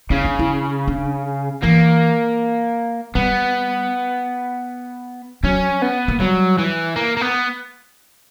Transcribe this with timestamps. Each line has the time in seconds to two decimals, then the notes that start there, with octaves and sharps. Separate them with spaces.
0.10 C#3 E4
0.25 D4
0.39 E4
0.88 D4
1.63 E3 A#3
3.15 G3 B3
5.44 F#3 C#4
5.82 B3
6.08 A#3
6.20 F#3 G3
6.58 E3
6.96 A#3
7.17 A#3
7.21 B3